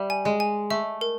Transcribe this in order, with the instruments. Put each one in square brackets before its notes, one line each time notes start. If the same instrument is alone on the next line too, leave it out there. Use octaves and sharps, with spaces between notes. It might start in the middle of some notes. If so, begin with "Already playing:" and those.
Already playing: [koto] G3 [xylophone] E5
[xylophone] G#5
[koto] G#3
[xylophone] G#5
[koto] A3 [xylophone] E5
[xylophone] A#4